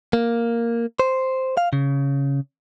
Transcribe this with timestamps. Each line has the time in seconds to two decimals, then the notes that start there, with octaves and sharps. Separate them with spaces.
0.13 A#3
1.00 C5
1.57 F5
1.73 C#3